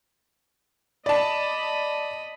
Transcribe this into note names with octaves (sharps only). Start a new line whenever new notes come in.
D5 D#5 A5 B5